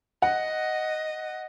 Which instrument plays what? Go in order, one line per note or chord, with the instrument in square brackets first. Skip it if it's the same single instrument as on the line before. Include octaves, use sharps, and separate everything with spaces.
[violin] D#5 [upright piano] F#5